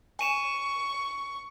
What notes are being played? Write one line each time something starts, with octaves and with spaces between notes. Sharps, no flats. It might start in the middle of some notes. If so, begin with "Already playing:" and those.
G#5 C#6 D#7 E7